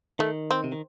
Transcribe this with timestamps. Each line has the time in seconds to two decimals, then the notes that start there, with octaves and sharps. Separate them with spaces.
0.19 D#3 A3
0.51 C4
0.64 C3
0.72 D#3